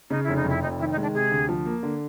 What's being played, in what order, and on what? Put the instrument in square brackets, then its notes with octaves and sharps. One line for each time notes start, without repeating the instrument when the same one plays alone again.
[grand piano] C#3 [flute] D#4
[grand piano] F1 [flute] E4
[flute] D#4
[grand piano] F2 [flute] E4
[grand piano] F1 [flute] D#4
[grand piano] D#3 [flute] E4
[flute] D#4
[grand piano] G#3
[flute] D4
[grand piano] C3 [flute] G#4
[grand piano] D2
F3
A#3
D3